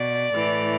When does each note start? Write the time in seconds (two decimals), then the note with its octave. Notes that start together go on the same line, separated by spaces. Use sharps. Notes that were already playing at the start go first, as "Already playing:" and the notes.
Already playing: B2 D5
0.34 A2 E3